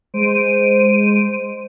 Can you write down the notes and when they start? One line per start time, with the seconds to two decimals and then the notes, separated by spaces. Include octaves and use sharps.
0.14 G#3 C5 D7 D#7